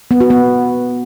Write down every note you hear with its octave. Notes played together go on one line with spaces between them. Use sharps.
B3
F#4
B3